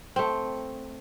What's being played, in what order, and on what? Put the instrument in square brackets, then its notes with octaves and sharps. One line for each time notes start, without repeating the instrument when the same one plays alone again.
[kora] A3 C4